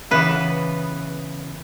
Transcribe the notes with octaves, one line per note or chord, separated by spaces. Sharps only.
C#3 E3 B3 B4